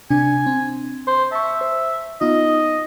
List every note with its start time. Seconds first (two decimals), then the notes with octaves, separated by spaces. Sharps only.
0.10 C3 D4 G#5
0.46 C4
1.07 C5
1.32 E5 A5 C#6
1.61 C5
2.21 B3 D#4 F4 D#5